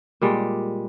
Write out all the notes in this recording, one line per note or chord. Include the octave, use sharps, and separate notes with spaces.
A#2 G3 G#3